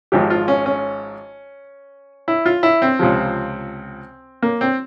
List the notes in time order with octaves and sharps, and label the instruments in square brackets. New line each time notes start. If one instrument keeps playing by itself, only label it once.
[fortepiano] G#1 G#2 F3 G4
F4
C#4
C#4
E4
F4
E4
C4
C#2 C3 F3
A#3
C4